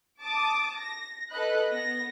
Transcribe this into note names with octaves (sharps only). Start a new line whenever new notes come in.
A5 D6 D#6
A#6
A4 B4 D#5 B5 F#6
B3 A#6